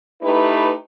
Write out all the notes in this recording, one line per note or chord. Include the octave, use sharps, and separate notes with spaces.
A3 D#4 E4 G4 B4